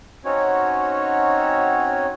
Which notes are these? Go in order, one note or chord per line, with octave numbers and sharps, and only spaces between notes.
C4 C#4 D#4 F#4 C#5